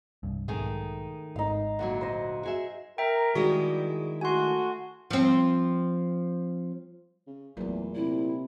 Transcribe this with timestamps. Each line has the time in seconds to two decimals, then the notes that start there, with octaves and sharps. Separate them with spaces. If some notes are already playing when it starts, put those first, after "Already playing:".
0.23 C2 G2
0.48 B1 G#2 D#3 G#3 A3 G#4 G#5
1.36 G#1 G#2 D#4 F5
1.79 D2 A#2 F#3 F#5
2.01 C5 D#5
2.43 F#4 G#4 E5
2.98 A#4 E5 G5
3.35 D#3 G3 G#3 E4 F#4 G#4
4.21 A3 F#4 G#5 C6
5.10 F3 C4
7.27 C#3
7.57 E2 A#2 F#3 A3
7.95 C3 E4